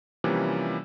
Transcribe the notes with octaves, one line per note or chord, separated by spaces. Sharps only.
C3 E3 F3 G3 A#3 C#4